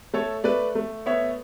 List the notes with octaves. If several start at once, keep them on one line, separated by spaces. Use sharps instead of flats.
A3 A4 C#5
A3 B4 D5
A3
B3 C#5 E5